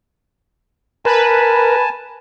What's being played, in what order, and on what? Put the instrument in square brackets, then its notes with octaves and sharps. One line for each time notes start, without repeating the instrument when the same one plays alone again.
[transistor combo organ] A#4 [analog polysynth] B4 [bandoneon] G#5 A5